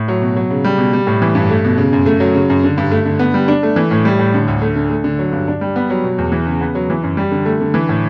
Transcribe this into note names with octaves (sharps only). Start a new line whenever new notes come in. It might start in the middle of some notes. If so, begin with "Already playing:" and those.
Already playing: A2
F#3
B2
F#3
C#3
G3
B2
G3
A2
E3
G2
A3
B2
C#3
F#2
A3
F#3
C#3
F#2
D3
G2
A3
D3
B3
G3
D4
A3
E3
A2
G3
A2
D3
D2
A3
D3
A3
D3
F#3
G2
D4
G3
B3
F#3
B2
E2
E3
C#3
B3
F#3
E3
F#2
G3
D3
A3
D3
E3
A2